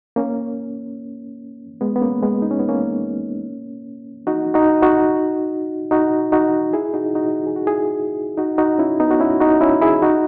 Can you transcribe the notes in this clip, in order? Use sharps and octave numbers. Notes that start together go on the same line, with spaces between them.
A#3 C#4
G#3 B3
B3
A#3 C#4
G#3 B3
D#4
C#4
B3
A#3 C#4
D#4 F#4
D#4 F#4
D#4 F#4
D#4 F#4
D#4 F#4
E4 G#4
D#4 F#4
D#4 F#4
G#4
F#4
E4 G#4
D#4 F#4
D#4 F#4
C#4 E4
B3 D#4
F#4
C#4 E4
D#4 F#4
C#4 E4
E4 G#4
D#4 F#4